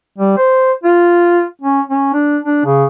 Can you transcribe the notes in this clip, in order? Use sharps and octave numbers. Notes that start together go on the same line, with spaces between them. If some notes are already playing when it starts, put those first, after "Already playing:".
G3
C5
F4
C#4
C#4
D4
D4
C#3